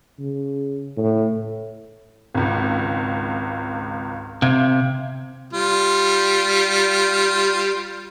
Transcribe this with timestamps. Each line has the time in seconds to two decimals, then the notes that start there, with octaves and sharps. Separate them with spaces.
0.19 C#3
0.97 A2
2.34 G#1 C#2
4.42 C3 F5 G#6
5.53 G3 F4